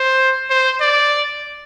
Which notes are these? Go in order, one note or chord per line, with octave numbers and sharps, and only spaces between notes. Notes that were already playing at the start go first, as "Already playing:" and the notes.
Already playing: C5
C5
D5